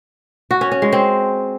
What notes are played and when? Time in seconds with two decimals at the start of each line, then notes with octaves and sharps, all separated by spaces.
0.51 F#4
0.61 C#4
0.72 C#4
0.82 G#3
0.93 C4